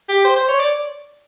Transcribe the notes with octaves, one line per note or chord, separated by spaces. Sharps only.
G4
C5
C5
C#5
D5